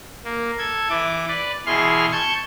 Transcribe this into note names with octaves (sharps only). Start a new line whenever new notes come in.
A#3
A4 G#6
E3 D6
B4 D5
B2 E3 G#4 C6 F6
A5 C#6 G6 G#6